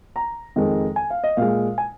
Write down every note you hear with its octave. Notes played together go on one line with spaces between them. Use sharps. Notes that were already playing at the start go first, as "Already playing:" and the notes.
A#5
F2 D#3 G#3
G#5
F5
D#5
A#2 G#3 F5
G#5